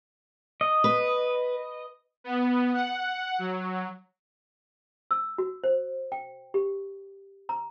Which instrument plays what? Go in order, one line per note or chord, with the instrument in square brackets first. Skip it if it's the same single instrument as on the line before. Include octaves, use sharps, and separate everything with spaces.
[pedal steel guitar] D#5
[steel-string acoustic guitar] B4
[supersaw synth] B3
F#5
F#3
[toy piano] E6
F#4
C5
G5
G4
A#5